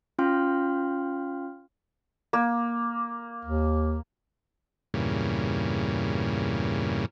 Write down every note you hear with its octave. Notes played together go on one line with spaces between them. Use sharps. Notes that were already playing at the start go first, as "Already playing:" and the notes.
C#4 F4 F5 G5 C6 F6
A#3
D#2
E2 G2 A#2 C#3